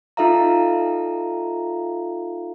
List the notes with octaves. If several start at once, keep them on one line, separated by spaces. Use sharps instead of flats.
D#4 F4 A4 E5 F5 A#5